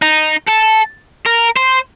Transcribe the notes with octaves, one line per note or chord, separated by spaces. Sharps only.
D#4
A4
A#4
C5